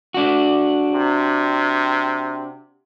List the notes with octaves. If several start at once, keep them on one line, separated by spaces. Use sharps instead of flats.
D4 F#4
C3